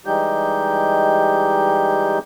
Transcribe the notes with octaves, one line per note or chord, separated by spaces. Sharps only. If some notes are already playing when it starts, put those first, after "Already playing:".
E3 G3 G#3 D#4 G4 G6